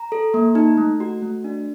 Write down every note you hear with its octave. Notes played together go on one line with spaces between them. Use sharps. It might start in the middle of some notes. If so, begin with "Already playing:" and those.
Already playing: A#5
A4
A#3
D#4
A3
F#4
A3
D4